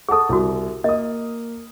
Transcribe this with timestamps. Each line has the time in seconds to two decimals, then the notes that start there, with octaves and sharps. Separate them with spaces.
0.09 G#4 A4 F#5 A5
0.29 C2 E4 F#4
0.84 A#3 D#5 D#6